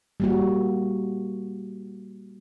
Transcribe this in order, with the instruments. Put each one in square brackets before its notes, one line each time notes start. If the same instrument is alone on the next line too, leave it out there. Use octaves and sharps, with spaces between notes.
[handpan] G3 A#3 F#4